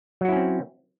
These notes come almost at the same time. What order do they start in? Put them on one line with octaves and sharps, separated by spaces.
F#3 F#4 E4 C#4 C4